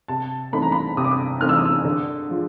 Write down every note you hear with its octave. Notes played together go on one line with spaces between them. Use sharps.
C3 A5
E3 A3 C4 D#4 B5
A#5
B5
C3 D#6
D6
D#6
E3 A3 C4 D#4 F6
E6
D#6
E6
D3
F3 G#3